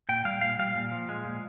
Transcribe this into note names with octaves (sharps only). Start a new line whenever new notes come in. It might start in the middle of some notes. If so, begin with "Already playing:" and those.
A#2 G5
G3 F5
A#2 F5
G3 F5
A#2
F3
G#3
A#2